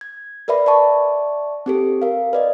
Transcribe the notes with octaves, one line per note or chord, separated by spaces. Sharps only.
G#6
A#4 B4 D5 E5 B5
D5 E5 A5 C#6
C4 G4 A4
A#4 F5
B4 D5 D#5